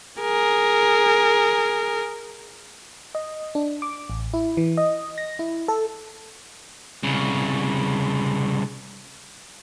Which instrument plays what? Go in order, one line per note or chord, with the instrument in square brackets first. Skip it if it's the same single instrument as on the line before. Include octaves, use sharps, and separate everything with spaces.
[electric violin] G#4 A#4
[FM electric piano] D#5
D4
D6
A1
E4
E3
D#5
A#6
E4
A4
[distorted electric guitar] C2 C#3